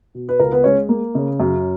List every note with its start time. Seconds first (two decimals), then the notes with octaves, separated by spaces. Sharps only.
0.15 B2
0.29 B4
0.39 C#2 A#4
0.52 B3 B4
0.64 G#3 C#4 C#5
0.89 A#3
1.15 C#3
1.40 F#2